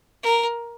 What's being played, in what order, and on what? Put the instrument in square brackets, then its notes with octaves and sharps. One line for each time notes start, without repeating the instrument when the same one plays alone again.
[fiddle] A#4